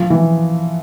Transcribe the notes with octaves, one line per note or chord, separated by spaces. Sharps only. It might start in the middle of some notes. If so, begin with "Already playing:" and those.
Already playing: F3
E3